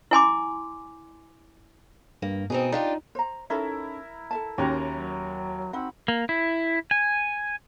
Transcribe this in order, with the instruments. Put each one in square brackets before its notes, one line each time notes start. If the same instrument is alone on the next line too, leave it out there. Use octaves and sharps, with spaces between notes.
[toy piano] E4 G#5 C6 D6
[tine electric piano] G2 [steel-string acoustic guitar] A#3
[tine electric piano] B2 [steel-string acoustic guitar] C4 D#4 G#4
[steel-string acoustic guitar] D4 F4 G4 [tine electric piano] D#4
[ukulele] C5 A#5
[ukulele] C#4 D#4 A4 [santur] E4 A#4
[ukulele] A4 E5 A5
[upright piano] D#2 C#4 G4 [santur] F#4 A#5 C6
[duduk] F#3
[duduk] C4 [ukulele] D#4 F#5 [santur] B5
[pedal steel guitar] A#3
E4
G#5